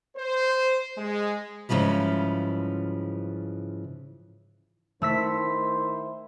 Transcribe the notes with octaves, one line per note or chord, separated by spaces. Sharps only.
C5
G#3
G#2 C#3 E3 F3 G3
D#3 A3 E4 C5 E6 B6